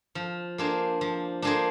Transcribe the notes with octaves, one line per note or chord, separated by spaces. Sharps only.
F3
A#3 D4 G#4 C5
F3
A#3 D4 G#4 C5